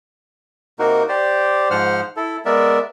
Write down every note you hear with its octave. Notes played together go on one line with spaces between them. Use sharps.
C3 A#3 D#4 F#4 A#4
G4 C5 D5
G#2 F3 C5 F#5 F6
E4 A4
G#3 B3 A#4 D5 E5